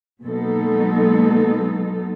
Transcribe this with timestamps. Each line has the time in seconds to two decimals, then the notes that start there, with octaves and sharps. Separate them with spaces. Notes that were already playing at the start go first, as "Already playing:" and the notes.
0.22 B2 F#3 G#3 A#3 D#4 A4